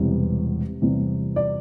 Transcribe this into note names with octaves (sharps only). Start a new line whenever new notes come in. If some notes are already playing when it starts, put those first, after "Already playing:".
Already playing: E1 E2 C3 E3 G3
E2 C3 E3 G3
D5